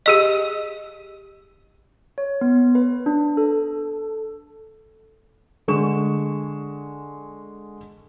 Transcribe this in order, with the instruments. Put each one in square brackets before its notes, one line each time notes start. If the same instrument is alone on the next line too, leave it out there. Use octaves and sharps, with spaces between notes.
[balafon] G4 G#4 D#5
[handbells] C#5
B3
B4
D4
A4
[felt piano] D3 G#3 C#6 E7